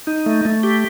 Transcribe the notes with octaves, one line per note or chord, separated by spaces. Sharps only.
D#4
A3
A3
G4